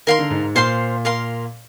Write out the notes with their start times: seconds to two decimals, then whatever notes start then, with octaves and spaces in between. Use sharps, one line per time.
0.07 D#3 A#4 F5 C6
0.19 D3
0.30 G#2
0.43 G#2
0.55 A#2 C5 F5 C6
1.05 A#4 F5 C6